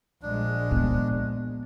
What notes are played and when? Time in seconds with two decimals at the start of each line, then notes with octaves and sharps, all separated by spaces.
0.23 A#1 G#3 D4
0.71 B3